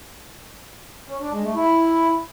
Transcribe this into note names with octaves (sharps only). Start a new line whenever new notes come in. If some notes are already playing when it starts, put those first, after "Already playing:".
C#4
D4
G#3
A3
E4